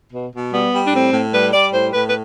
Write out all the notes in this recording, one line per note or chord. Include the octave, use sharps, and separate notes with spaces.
B2
B2
G3 B3
G3
D4
A2 C4
A2
G3 B4
G3 D5
A2 C5
A2 B4
B4